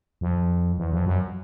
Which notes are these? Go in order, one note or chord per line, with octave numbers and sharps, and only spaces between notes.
F2
E2
F2
F#2